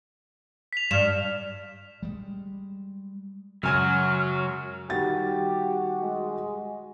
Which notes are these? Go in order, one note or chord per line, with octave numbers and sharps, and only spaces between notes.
B6 F7
G2 F6 E7
G3 G#3
F#2 C#3 F#3 G#3 F#4 G#5 F6 G#6
D#3 G3 F#4 G4 A6
G#3